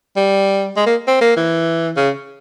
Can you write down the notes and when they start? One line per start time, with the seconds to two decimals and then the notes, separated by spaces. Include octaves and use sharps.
0.17 G3
0.77 G#3
0.86 A#3
1.07 C4
1.21 A#3
1.37 E3
1.96 C#3